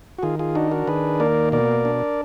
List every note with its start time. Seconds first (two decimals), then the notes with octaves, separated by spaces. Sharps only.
0.19 F#4
0.23 D#3 F4 G#4
0.39 F4 G#4
0.55 D4 D#4 F#4
0.71 F#4 A#4
0.87 D#3 G#4 B4
1.20 A#3 A#4 D5
1.52 B2 A#4 D5
1.85 D4